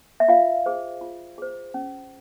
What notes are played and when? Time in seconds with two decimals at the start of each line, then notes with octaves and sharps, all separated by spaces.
0.20 E5
0.28 F4 F5
0.66 G#4 C5
1.01 F4
1.38 G#4 C5
1.74 C#4